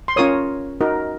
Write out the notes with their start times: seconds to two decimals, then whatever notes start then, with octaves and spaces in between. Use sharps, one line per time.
0.08 C6
0.16 C#4 F4 A#4 C#5 D#6
0.81 D#4 F#4 A#4